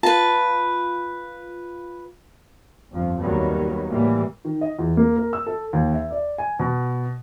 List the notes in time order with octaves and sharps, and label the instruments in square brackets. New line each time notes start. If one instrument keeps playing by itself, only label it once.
[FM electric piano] F4 [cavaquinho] B4 A5
[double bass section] G1 F2 F3
D#2 D#3 F#3 G3 B3
C#2 A2 E3 G3 A#3
[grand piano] D#3
D#5
E2
A#3
A#4
E6
A4
D#2
E5
D5
G#5
B2